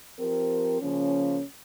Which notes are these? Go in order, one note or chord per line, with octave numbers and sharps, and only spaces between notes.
F3 C4 G4 A#4
C#3 F3 A#3 C#4